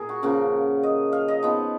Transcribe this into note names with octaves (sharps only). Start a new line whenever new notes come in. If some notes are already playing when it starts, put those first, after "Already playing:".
Already playing: A#2 G#4 A#4
F#4
C#3 F3 A#3 F#4
D#5
F5
D#5
F3 B3 D#4